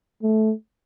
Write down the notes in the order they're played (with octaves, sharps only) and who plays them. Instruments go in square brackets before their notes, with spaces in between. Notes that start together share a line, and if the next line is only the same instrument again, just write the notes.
[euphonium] A3